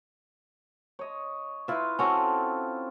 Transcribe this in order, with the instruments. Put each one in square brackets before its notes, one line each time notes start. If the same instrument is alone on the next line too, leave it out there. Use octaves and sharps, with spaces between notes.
[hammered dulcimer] C#5 D#5
[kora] E4 E5 [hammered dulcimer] F4 B4
[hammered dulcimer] C4 A4 C#5 [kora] C#4 F#4